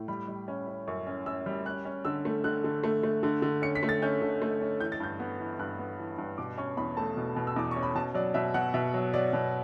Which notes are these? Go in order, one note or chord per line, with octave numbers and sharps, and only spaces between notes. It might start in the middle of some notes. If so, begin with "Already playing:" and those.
Already playing: A2
G3 B5
G3
C#4
C#4
F#2 C#6
C#4
C#4 E6
G3
C#4 F#6
C#4
D3 E6
A3
D3 F#6
D3
A3
A3
D3
D3
C#4 C#7
B6
A3
A6
C#4 G6
D3
A3
C#4
E3 G6
A6
G2 G6
B3
E3
G2 F#6
B3
E3
G2
B2 D6
C#4 C#6
E2 B5
A3 A5
B2
B2
E6
E2 D6
C#4 C#6
B5
B2 A5
F#3 D5
B2 E5
B2 F#5
B2 E5
F#3
F#3 D5
B2